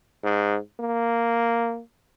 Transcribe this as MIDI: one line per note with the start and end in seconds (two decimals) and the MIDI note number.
0.23 0.58 44
0.80 1.81 58